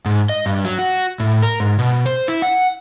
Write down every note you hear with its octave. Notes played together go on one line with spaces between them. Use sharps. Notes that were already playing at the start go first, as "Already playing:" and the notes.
G#2
D#5
G2
F#3
F#4
A2
A#4
G#2
B2
C5
E4
F#5